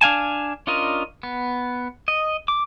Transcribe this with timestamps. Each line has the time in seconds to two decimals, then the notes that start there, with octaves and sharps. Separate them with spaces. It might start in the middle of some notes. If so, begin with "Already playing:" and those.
0.01 D4 F5 G#5 A5
0.67 C#4 D4 F4 A#4 D#5
1.23 B3
2.08 D#5
2.48 D6